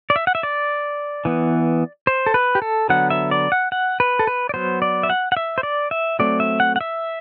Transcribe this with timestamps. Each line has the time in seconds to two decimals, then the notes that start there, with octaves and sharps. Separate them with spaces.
0.10 D5
0.16 E5
0.27 F#5
0.35 E5
0.43 D5
1.25 E3 B3
2.07 C5
2.26 A4
2.34 B4
2.55 G4
2.62 A4
2.89 D3 F#3 B3 F#5
3.10 E5
3.31 D5
3.52 F#5
3.72 F#5
4.00 B4
4.19 A4
4.27 B4
4.49 D5
4.54 F#3 B3 C5
4.82 D5
5.03 E5
5.10 F#5
5.32 F#5
5.37 E5
5.58 C5
5.63 D5
5.91 E5
6.19 F#3 A3 C4 D5
6.40 E5
6.60 F#5
6.76 F#5
6.81 E5